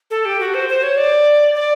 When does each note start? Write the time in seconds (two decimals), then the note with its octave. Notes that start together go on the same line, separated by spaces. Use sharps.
0.11 A4
0.25 G4
0.40 F#4
0.54 C5
0.69 C5
0.83 C#5
0.97 D5
1.55 D5